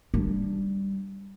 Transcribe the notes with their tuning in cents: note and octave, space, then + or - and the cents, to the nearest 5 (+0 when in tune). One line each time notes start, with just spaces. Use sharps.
G3 +0 D4 +0